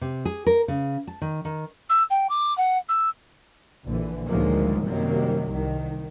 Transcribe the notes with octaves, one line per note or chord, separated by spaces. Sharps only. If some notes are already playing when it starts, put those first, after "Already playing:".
C3
G#4
A#4
C#3
A5
D#3
D#3
E6
G5
D6
F#5
E6
A#1 D3 E3
D2 D#3 F3 F#3 G#3 A#3
F#2 C3 D#3 F#3 G3 A#3
C2 D#3